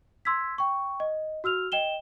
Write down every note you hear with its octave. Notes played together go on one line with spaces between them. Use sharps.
C6 E6 G#6 B6
G5 C#6
D#5
F#4 E6 F6 F7
D#5 G5 E7 G7